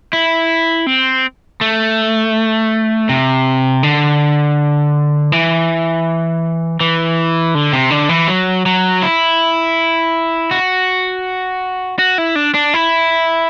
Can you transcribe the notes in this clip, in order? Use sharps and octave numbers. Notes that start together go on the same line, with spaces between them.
E4
C4
A3
C3
D3
E3
E3
D3
C3
D3
E3
F#3
F#3
E4
F#4
F#4
E4
D4
D4
E4